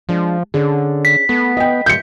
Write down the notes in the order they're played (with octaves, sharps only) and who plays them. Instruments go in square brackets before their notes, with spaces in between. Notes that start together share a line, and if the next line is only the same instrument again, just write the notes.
[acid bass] F3 [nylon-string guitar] G#3 D4
[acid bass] D3 [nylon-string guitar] C#4 D4 G#4
[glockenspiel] B6
[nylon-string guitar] A3 [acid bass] B3
[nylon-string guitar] B4 [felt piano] D#5 G5
[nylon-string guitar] A#2 G3 [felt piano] G6 C#7